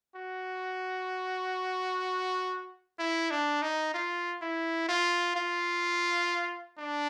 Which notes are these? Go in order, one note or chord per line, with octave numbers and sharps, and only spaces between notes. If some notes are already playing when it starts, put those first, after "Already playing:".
F#4
E4
D4
D#4
F4
E4
F4
F4
D4